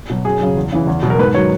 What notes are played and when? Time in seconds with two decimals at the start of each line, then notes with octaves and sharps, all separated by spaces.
0.10 B2 F#3
0.25 F#2 G#4
0.41 C#3 F#3
0.57 E2
0.72 C#3 E3
0.87 E2
1.03 B2 F#3
1.10 A#4
1.19 G#2 B4
1.34 D#3 F#3 C#5